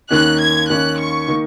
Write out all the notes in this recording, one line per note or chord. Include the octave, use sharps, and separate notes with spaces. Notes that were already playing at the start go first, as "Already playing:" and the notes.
D#2 D#3 A#3 C#4 F#6
G#6
D#2 D#3 A#3 C#4 F#6
C#6
D#3 A#3